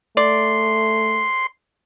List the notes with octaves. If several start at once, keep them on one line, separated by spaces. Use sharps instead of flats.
A3 D5 C6